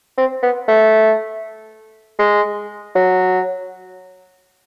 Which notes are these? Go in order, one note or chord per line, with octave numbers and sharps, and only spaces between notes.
C4
B3
A3
G#3
F#3